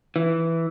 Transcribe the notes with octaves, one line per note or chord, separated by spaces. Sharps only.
E3